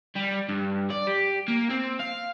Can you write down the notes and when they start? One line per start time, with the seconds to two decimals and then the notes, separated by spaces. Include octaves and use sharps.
0.16 G3
0.49 G2
0.90 D5
1.07 G4
1.48 A#3
1.70 C4
1.99 F5